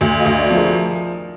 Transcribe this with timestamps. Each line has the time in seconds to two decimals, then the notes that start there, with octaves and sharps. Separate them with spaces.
0.01 D2
0.20 D#5 F5
0.26 D2
0.38 D5 E5
0.50 F3
0.57 G#4 A#4